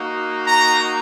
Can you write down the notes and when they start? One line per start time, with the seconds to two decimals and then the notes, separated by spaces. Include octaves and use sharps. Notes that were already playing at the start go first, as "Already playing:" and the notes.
Already playing: A#3 D#4 F#4
0.47 A#5